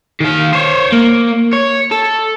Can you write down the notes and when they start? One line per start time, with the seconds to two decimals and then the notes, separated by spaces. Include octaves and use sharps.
0.20 D#3 F5
0.53 C5 C#5
0.93 A#3
1.53 C#5
1.91 A4